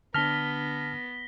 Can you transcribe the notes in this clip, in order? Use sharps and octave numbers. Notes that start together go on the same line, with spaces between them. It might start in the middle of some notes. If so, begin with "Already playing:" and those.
D3 B3 D4 A5 F6 A#6 B6 G7